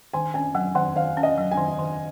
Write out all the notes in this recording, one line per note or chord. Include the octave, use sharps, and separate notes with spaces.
D#3 G#5
C#4 G#5
F#3 F#5
D#3 F#5
D#3 F5
C#4
D#5
F#3
G#5
D#3
D#3